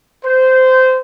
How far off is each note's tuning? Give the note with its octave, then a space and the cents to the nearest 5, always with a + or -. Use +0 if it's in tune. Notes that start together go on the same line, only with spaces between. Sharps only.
C5 -15